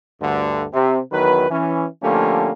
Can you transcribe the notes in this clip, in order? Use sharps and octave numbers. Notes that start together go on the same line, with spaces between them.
D2 G2 D3
C3
E2 D#3 F#3 B4
E3 C#4
D3 F3 A3 A#3 C#4 G4